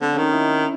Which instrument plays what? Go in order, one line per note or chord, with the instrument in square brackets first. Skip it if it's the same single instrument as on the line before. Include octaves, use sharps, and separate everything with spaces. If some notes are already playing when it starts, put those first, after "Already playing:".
[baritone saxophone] D3 [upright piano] C4
[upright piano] C#4
[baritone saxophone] D#3 [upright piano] D#4
[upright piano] E4